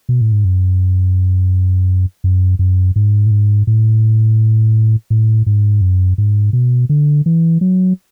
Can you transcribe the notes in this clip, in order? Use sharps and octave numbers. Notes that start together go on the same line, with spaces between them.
B2
A2
G#2
F#2
F#2
F#2
G#2
A2
G#2
A2
A2
G#2
F#2
G#2
B2
D3
E3
F#3